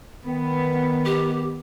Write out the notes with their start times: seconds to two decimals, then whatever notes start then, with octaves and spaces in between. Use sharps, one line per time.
0.24 D#3 B3
1.05 G4